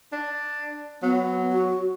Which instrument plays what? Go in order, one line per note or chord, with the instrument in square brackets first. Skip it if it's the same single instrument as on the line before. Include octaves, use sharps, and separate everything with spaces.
[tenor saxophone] D4
[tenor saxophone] F#3 [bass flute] B3
[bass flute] F#4